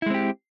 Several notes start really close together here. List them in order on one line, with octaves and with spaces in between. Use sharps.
E4 G#3 C4 G4